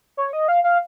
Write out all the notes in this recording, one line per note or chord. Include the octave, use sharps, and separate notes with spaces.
C#5
D#5
F5
F5